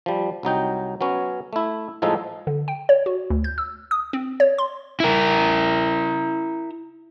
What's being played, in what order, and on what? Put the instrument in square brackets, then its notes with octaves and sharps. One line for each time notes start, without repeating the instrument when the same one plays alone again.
[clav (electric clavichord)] F3 G3
C2 F#3 D#4 G5
F#3 B3 C#4
A3 E4
A2 F3 G#3 D#4 A4
[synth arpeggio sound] D3
G5
C#5
F#4
D2
G6
E6
D#6
C4
C#5
C6
[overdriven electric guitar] E4 A#4